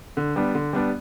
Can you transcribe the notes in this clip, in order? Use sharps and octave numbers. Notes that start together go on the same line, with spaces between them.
D3
G3 B3 D4
D3
G3 B3 D4